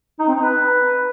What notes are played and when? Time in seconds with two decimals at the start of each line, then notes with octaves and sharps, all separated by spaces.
0.19 D#4
0.27 C4
0.35 D#4
0.43 B4